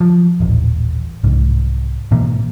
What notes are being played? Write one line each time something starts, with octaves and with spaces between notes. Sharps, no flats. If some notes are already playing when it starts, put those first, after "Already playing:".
F3
D#1 A1
C2 G#2
G#2 B2 E3 A#3